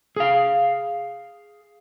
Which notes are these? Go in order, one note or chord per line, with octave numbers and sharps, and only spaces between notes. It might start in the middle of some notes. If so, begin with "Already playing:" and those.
G#4 F5